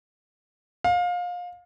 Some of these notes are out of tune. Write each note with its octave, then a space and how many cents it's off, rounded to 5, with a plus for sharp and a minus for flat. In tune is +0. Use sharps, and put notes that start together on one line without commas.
F5 +25